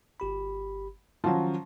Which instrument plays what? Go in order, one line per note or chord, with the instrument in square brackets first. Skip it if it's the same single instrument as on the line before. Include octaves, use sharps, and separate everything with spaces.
[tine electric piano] G1 G4 B5
[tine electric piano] D#3 C#4 [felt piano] F3 F#3